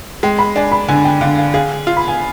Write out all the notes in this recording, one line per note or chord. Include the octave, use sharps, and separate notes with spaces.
G#3 G5
B5
D4 G#5
B5
D3 G#5
G5
D3 F5
F5
G#4 F5
F4
B5
G#5